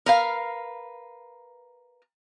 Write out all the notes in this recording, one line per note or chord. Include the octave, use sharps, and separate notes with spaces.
A#4 B4 F5